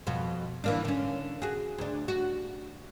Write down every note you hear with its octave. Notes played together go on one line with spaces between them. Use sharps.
F2 B2 F#4
E3 A#3 D4
D3 C#4
F#4 G#4
D2 D4
F#4